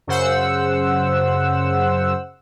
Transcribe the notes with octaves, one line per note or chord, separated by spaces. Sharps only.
F#2 C#3 C5 F#5 E6